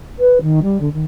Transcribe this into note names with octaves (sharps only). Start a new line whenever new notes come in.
B4
D#3
G3
D3
D#3